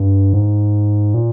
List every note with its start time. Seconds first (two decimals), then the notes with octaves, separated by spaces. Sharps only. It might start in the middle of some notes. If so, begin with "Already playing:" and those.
Already playing: G2
0.33 G#2
1.14 A#2